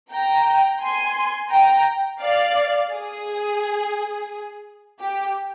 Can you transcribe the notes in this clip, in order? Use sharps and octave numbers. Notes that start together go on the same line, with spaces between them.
G5 A#5
G#5 C6
G5 A#5
D5 F5
G#4
G4